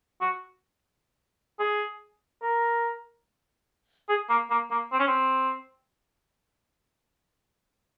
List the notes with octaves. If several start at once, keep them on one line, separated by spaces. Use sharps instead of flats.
F#4
G#4
A#4
G#4
A#3
A#3
A#3
C4
C#4
C4